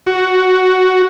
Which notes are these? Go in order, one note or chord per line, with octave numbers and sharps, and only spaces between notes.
F#4